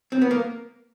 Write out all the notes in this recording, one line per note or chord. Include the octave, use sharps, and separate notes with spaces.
C4
B3
A#3